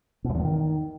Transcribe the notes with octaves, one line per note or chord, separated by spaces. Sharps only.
B2
F#2
E2
A2
D#3